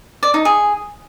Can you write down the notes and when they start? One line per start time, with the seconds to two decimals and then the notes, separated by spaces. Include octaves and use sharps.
0.23 D5
0.34 D#4
0.45 G#4